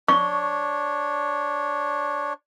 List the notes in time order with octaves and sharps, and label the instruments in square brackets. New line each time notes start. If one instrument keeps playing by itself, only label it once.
[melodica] D4 C#5 [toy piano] C#6